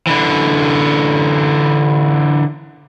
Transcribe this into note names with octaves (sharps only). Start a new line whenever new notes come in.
D3 E3